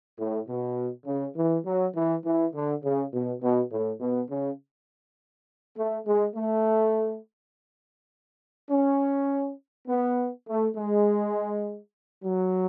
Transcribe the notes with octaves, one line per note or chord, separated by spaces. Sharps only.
A2
B2
C#3
E3
F#3
E3
E3
D3
C#3
B2
B2
A2
B2
C#3
A3
G#3
A3
C#4
B3
A3
G#3
F#3